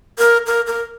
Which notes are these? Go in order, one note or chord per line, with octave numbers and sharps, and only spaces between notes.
A#4
A#4
A#4